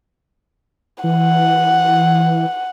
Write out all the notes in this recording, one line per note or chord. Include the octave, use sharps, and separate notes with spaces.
E3 F#5